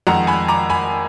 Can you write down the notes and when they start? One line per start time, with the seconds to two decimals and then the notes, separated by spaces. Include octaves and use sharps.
0.07 F2 D#3 G#3 F#5 A#5
0.27 G#5 B5
0.48 A#5 D6
0.70 G#5 B5